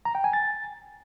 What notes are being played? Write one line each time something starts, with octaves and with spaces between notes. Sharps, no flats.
A#5
G5
G#5
A6